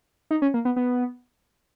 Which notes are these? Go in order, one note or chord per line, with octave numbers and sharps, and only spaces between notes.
D#4
C#4
A#3
B3
B3